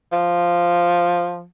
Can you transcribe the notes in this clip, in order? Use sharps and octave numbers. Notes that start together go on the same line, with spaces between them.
F3